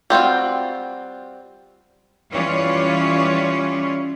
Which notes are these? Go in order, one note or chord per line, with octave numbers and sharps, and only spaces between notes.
G3 C4 F4 F#4
E3 G3 C#4 F4 C#5 D5